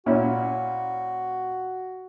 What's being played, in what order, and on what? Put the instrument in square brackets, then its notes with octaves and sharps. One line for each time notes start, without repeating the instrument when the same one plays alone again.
[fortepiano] A#2 C#4 E4 [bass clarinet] F#4